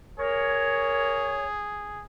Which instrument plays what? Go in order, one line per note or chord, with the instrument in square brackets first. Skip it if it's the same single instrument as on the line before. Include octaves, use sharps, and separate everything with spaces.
[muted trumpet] G#4 [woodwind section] A#4 C#5